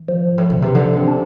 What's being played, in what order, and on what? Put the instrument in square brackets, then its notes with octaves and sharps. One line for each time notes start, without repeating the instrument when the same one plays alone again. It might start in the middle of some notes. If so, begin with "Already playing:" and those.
Already playing: [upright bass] E3
[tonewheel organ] F3
[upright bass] G#2
A2
[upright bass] B2 [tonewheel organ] D3
[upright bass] C3 [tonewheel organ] E3
[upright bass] D3 [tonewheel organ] F3
[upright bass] C3
[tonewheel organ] D4